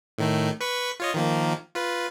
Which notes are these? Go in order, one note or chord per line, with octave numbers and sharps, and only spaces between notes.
A2 D#3 A3
B4 C#6 B6
F4 C#5 D#5
D#3 F3 A#3
F4 B4